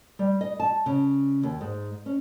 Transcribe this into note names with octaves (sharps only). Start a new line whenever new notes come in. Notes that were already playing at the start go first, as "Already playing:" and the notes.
G3
D#5
A5
C#3
D#2
G#2
C#4